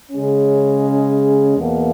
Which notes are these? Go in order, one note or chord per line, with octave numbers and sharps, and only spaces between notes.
C#3 G#3 C#4
E2 B2 A#3